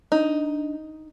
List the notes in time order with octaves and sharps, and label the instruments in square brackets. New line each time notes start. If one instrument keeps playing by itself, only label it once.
[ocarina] D4 [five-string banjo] D#4